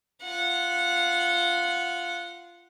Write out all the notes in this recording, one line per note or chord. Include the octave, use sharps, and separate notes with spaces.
F4 F#5